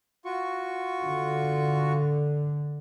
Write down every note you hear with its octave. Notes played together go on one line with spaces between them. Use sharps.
F4 F#4 C#6
D3